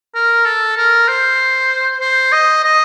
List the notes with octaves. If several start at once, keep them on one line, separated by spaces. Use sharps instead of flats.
A#4
A4
A#4
C5
C5
D#5
D#5